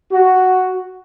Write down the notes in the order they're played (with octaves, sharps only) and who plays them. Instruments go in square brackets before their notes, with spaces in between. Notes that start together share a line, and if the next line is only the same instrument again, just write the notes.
[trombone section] F#4